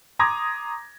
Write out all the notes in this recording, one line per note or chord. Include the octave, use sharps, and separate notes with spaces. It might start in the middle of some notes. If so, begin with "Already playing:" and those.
A#5 C6 D6 D#6 G#6 A#6